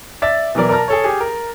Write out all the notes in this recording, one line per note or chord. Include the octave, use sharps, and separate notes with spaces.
D5 E5 A6
B2 E3 F#3 A#4 D5
A#4 D5 A5 A#5 F6
G#4 A4 C#5
G4 G#4
A#4